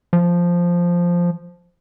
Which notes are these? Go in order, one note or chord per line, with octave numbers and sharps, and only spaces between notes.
F3